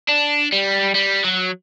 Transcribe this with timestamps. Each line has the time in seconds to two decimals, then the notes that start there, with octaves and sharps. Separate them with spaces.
0.09 D4
0.52 G3
0.95 G3
1.25 F#3